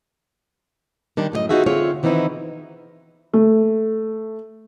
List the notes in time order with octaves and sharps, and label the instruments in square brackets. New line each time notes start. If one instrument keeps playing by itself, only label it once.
[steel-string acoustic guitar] D#3 G3 D4
F#2 A2 G4 D#5
B3 D#4 F4 F#4 G#4 E5
D3 C4 F4 G#4 C#5 E5
D#3 E3 B3 C4 D#4 E4
[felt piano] A3